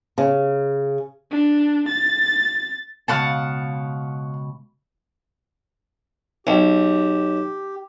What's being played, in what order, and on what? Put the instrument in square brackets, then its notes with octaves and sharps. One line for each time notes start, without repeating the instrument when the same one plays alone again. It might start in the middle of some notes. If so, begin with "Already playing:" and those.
[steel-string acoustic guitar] C#3
[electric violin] D4
A6
[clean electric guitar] C#2 G2 B2 [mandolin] F5 F#5 A5
[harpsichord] B1 [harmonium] G4